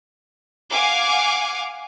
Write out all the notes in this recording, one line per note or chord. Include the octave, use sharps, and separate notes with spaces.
F5 F#5 G#5 D6